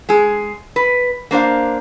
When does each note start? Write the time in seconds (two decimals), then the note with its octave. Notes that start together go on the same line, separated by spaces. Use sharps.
0.09 G#3 G#4
0.76 B4
1.31 A#3 D4 C5 F5